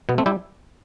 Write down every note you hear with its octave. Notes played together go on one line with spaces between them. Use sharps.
B2 B3
A3 C4
G3 E4 G4